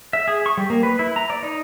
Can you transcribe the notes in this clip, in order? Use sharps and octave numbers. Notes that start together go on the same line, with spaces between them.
E5
G#4
C#6
G3
A#3
B4
E4
A#5
D5
D#4